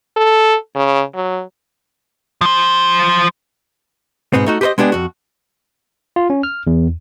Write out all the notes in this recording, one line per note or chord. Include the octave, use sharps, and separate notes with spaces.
A4
C#3
F#3
F3 C5
G#2 B2 B3 C4
A3 D#4 F#4
G4 G#4 B4 C5 D#5
G#3 B3 D4 G4 G#4
F2 F#4
F4
C#4
F6
E2